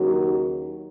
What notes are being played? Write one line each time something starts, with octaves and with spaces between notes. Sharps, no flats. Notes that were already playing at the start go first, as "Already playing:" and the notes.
Already playing: D#2 C#3 F#3 F#4